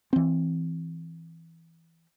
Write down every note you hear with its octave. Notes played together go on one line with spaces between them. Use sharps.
E3 C4